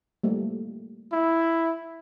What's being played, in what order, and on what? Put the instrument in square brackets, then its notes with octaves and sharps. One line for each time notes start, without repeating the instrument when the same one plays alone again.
[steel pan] G3 A3 A#3
[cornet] E4